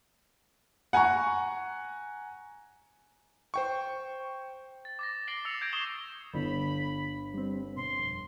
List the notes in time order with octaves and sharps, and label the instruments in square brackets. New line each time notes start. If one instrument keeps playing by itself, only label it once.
[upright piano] F#5 G#5 A#5 C#6
[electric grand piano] C5 G5 C#6
[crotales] A6
D6 A6 A#6
A6 A#6 C7 D7 F#7 G7
D6 E6 C#7 F7
G6 G#6 A#6 D7
C#6 D#6 G#6 C7 E7 G7
[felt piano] G1 D3 [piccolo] B5
[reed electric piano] G3 C4
[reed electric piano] B2 [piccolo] C6
[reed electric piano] F2